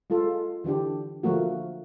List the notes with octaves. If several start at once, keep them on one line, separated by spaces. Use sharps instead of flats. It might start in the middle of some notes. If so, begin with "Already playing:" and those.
G#3 F4 A4
D3 E3 D4 G4
D3 F3 A3 A#3 F#4